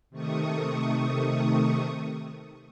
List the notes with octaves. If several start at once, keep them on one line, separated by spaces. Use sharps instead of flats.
C3 D#3 A3 C#6 D#6